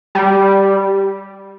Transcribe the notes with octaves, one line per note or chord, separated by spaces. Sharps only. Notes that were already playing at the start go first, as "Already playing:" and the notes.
G3